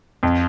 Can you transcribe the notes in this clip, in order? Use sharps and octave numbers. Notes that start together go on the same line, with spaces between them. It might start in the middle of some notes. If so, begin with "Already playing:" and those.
F2